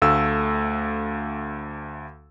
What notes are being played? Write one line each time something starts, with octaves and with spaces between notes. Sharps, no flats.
D2 A3 F5 E6